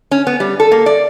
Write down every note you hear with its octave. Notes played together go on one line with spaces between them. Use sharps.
C#4
B3
G3
A4
A#3
D5